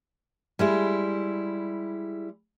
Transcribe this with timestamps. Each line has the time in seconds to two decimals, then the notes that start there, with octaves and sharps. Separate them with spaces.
0.59 G3 G#3 E4